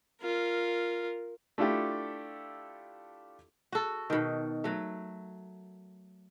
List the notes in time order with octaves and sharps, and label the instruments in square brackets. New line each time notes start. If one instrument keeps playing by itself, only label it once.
[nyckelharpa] F4 A#4
[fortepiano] A3 D4 E4 F4 G4 A4
[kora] F#4 A4
B2 D#3
F#3 A3